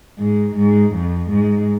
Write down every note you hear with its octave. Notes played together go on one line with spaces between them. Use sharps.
G#2
G#2
F2
G#2